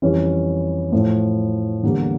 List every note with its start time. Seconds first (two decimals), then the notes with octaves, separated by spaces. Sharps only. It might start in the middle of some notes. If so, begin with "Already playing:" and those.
0.02 F2 E3 G3 C#4
0.92 A2 F3 A3
1.83 E2 D3 G3 A#3